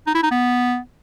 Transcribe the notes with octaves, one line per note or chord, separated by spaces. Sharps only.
D#4
E4
D#4
B3